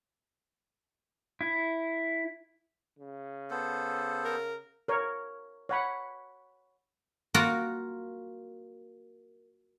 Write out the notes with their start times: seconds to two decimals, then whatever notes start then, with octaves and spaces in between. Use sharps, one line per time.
1.41 E4
2.99 C#3
3.51 B3 A4 C5
4.25 A#4
4.88 A#4 C#5
5.69 C#5 F#5 B5
7.34 A#3 F4 F#4 A#4